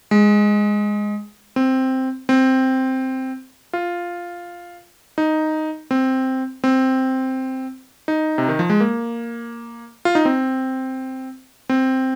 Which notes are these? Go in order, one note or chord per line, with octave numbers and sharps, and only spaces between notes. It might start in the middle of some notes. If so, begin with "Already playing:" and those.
G#3
C4
C4
F4
D#4
C4
C4
D#4
C3
D#3
F3
G#3
A#3
F4
D#4
C4
C4